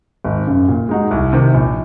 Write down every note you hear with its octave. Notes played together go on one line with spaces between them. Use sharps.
G#1
F#2 C#3
A#2
G#3 D#4 F#4
C2
C3 D#3
A#1